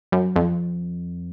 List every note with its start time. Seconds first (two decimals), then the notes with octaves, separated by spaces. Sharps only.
0.12 F#2
0.36 F2